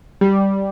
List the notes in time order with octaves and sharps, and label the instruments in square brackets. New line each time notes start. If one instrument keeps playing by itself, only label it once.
[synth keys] G3